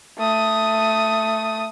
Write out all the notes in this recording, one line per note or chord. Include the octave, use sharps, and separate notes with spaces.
A3 D#6